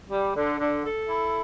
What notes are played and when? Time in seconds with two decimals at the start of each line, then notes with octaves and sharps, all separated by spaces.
0.10 G3
0.36 D3
0.60 D3
0.84 A4
1.09 E4